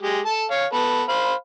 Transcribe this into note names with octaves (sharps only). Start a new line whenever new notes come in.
G#3 G4
A4 A5
C#5 F5
B3 A4 B4
C5 F5 B5